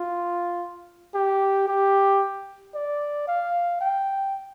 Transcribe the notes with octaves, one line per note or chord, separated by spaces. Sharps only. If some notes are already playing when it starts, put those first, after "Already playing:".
Already playing: F4
G4
G4
D5
F5
G5